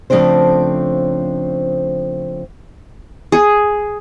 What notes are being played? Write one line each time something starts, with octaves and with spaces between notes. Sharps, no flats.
C#3 F3 A3 C4 D4 C5
G#4